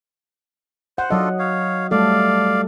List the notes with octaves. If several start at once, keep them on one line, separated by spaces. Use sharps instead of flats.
C5 F#5
F#3 D4 F4 A4 D#5
C#5 F5
G3 A3 A4 D5 F5